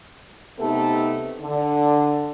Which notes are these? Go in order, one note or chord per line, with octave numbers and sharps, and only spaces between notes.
C3 A3 B3 D#4 G4 A4
D3